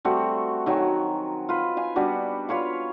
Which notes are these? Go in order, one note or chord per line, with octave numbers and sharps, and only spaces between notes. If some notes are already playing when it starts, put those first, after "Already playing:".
G3 A3 C4 F#4
D#3 F#3 G#5
F4 B4
F5 G#5
G3 B3 D4 F#4
F4 B4 C#5 F5